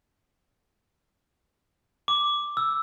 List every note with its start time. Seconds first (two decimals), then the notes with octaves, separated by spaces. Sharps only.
2.08 D6
2.57 E6